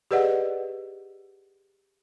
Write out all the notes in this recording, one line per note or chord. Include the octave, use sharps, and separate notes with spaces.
G4 G#4 B4 D5 D#5 F#5